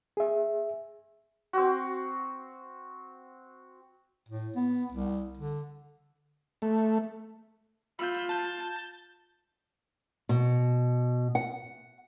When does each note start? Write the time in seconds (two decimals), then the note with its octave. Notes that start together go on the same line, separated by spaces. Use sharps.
0.17 G#4 E5
1.53 C4 F#4
4.28 A2
4.56 B3
4.91 C2
5.37 D3
6.62 A3
7.99 F4 B5 E6 G6
8.29 A5 G6
10.29 B2
11.35 F#5